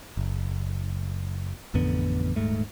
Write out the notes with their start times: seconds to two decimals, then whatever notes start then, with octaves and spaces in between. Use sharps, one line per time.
0.17 F#1
1.74 A1 F2 D3 B3
2.36 D#1 G#2 A3